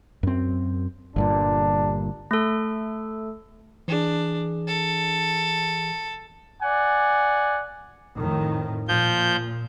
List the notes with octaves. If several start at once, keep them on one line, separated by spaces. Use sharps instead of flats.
F#2 C4
G1 G2 A#2 D4
A3 A4
E3 D4 G#4
A4
D5 F#5 G#5
F2 A2 D#3
A#2 F3 G6